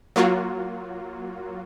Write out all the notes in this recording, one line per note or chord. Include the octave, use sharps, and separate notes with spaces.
F#3 A#3 F4 F#4